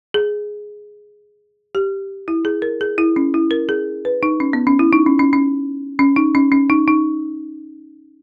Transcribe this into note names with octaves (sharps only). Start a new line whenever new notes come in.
G#4
G4
E4
G#4
A#4
G#4
E4
C#4
E4
A#4
G#4
B4
D#4
C#4
B3
C#4
E4
D#4
C#4
C#4
C#4
C#4
D#4
C#4
C#4
D#4
D#4